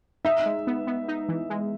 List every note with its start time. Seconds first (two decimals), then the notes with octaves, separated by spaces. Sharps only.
0.25 D#4 E5
0.46 G#3
0.67 B3
0.87 B3
1.08 D#4
1.28 E3
1.50 G#3